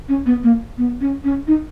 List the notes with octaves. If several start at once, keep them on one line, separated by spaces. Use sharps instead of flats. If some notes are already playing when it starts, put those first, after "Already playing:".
C#4
B3
A#3
B3
C#4
C#4
D#4